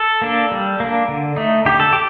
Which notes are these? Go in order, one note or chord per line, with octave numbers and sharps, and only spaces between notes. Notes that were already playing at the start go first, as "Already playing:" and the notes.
Already playing: A4
A#3 D4
G3
A#3 D4
D3
A3 D#4
D3 G4
A4
G4